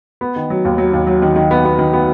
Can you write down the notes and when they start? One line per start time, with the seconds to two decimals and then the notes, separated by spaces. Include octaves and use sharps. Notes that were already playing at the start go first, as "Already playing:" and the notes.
0.21 B3
0.36 D#3
0.50 F#3
0.65 D#2
0.78 F#3
0.93 D#2
1.07 F#3
1.22 D#3
1.36 D#3
1.51 B3
1.65 B3
1.78 D#3
1.93 B3